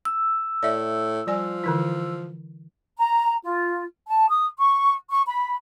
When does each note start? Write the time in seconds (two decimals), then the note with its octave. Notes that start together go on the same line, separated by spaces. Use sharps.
0.05 E6
0.63 A2 D5 E5
1.27 F3 G3 D5 G#5
1.64 D3 E3 E4
2.98 A#5
3.44 F4
4.07 A5
4.29 D#6
4.58 C#6
5.11 C#6
5.28 B5